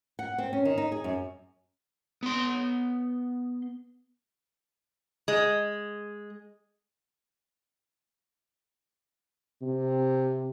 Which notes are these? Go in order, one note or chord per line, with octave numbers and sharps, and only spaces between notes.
F#5
C4
C#4
D#3
D#4
G#4
F#2
B3 C6
G#3
C3